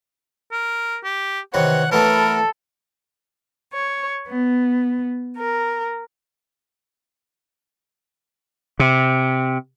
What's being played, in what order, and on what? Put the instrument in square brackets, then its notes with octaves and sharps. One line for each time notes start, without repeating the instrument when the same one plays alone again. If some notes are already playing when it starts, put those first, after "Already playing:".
[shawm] A#4
G4
[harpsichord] C3 D#3 E3 [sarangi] C#5 [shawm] F#5
[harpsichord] E3 A3 B3 [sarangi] A4 [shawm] A#4
[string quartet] C#5
B3
A#4
[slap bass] C3